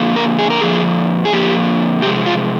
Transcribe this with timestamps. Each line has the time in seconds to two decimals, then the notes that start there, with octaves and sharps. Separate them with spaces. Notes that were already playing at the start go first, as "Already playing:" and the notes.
Already playing: F2 D3 F3 A#3
0.16 A#4
0.39 G#4
0.50 A#4
0.61 F2 D3 F3 A#3 G#4
1.25 G#4
1.32 F2 D3 F3 A#3 G4
2.02 C3 F3 G#3 G4
2.26 F4